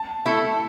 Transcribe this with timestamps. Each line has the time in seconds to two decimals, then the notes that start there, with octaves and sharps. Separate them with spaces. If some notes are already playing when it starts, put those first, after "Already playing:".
Already playing: A5
0.26 A3 E4 A4